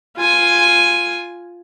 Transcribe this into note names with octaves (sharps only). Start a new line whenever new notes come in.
F4 G#5